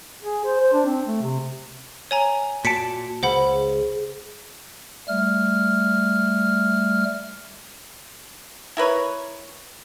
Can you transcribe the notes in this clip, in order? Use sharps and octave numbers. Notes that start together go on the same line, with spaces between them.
G#4
C5
C5
D4
C4
A3
C3
C#5 G#5 A#5
A#2 F#4 A5 B6 C#7 D7
C#2 G#4 C5 F#5 B5
G3 A3 F6
E4 A#4 B4 C#5